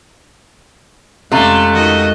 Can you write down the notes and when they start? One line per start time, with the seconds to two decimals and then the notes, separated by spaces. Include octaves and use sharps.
1.32 F2 C3 G#3 A3 C#4 F4 D5 F#6
1.73 D#3 F#4 D#5